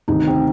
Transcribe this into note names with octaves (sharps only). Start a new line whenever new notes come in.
D2 C3 D#3 D#4
C4